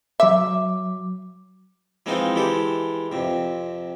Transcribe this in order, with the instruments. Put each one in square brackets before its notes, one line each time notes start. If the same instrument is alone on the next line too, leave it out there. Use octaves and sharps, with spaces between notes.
[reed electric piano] F#3 D6 [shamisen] E5
[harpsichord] E3 F3 G#3 C4 D#4 F4
E3 G#3 G4 A4
F2 C3